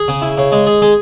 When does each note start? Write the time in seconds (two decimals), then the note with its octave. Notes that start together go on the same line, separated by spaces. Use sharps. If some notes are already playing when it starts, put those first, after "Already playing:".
Already playing: G#4
0.08 C#3
0.22 E4
0.38 C#3
0.52 G#3
0.67 G#4
0.82 G#3